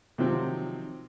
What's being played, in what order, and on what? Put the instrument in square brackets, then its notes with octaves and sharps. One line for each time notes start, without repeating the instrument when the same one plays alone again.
[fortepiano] C3 D#3 F3 F#3 C4